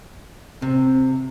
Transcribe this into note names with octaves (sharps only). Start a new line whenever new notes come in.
C3 C4